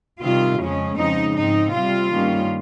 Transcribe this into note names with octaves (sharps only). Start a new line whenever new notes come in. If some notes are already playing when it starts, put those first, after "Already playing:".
C3 D#3 G3 C4 F4
F2 C#3 F3 G#3 C#4
F2 C#3 F3 G#3 C4 D#4
G#2 F3 C4 D#4
C3 G3 C4 F4
G2 D#3 G3 A#3 C#4